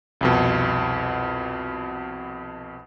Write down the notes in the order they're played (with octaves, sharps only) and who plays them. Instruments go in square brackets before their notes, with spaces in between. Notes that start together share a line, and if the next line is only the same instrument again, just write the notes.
[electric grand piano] C2 F2 B2